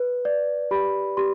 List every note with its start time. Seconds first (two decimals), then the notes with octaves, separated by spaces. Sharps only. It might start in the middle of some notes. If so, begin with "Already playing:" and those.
Already playing: B4
0.25 D5
0.71 G4 B5
1.17 G4 C6